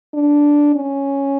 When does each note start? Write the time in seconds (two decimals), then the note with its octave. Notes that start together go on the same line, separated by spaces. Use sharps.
0.14 D4
0.76 C#4